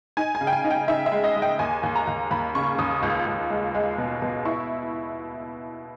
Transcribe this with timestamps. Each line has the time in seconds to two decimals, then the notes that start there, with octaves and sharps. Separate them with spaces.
0.17 D#4 G#5
0.35 G#5
0.41 C#3
0.47 G5
0.53 G#5
0.64 D#4
0.71 G5
0.88 D#4 E5
1.06 E5
1.12 G#3
1.24 D#5
1.36 G#3
1.42 G5
1.59 D#2 G#5
1.83 D#2
1.96 A#5
2.07 D#2
2.31 D#2 B5
2.55 C#3 C#6
2.78 D#2 D#6
3.03 C#2
3.26 C#2
3.50 G#3
3.75 G#3
3.98 B2
4.22 B2
4.45 E4 C#6